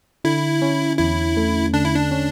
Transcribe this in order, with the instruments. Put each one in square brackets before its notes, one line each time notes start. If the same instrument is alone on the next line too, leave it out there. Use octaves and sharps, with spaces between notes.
[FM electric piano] D3 [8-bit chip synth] E4
[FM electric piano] C#4
[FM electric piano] E2 [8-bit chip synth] E4
[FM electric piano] A3
[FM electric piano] D3 [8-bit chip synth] D4
[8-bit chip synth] E4
D4
[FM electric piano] C#4